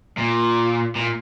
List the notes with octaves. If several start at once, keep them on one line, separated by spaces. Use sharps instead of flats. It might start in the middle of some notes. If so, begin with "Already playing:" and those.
A#2
A#2